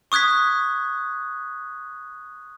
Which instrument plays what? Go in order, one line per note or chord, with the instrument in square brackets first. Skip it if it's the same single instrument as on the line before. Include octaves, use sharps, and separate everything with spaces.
[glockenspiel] C#6 D#6 F#6 G#6 B6